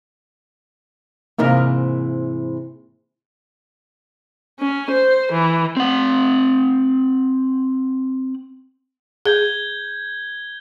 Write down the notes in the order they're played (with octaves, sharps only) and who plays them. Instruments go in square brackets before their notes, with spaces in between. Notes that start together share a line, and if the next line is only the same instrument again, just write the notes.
[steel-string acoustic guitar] G#2 C3 E3 [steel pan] A#3 D#4 A#4
[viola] C#4
C5
E3
[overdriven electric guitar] C4 F#5
[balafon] G#4 [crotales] G6 G#6 G7